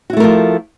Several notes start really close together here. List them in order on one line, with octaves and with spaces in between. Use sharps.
F#4 E4 A3 A#4 F3